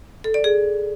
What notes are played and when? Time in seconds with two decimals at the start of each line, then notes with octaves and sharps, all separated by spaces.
0.24 A4
0.34 D5
0.44 G#4